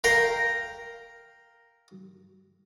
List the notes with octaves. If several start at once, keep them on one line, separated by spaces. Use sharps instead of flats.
A#4 F5 G5 A#5